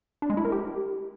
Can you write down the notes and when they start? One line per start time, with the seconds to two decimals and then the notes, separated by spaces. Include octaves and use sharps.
0.22 D4
0.30 G#3
0.37 E4
0.45 A#4
0.52 G4